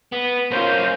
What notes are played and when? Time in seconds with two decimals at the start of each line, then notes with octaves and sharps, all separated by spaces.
0.12 B3
0.51 A#3 C#4 F4 C5